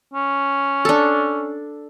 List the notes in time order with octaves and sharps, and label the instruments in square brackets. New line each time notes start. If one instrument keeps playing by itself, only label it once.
[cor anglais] C#4
[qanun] D4 A4